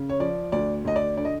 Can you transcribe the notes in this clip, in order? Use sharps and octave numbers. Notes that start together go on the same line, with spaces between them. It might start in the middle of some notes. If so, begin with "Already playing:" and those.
Already playing: C#3
C#5
F3 D5
D2 D5
D2 D#5
D5
D3 D5
D#5